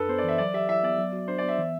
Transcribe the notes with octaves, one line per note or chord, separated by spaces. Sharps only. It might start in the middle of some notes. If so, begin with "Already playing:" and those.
Already playing: F#2 D4 A4 B4
B3 C5
D5
E3 E5
F#3 D5
G4 E5
E4 E5
B3 D5
F#3
F#4
D4 C5
D5
B3
E5
E3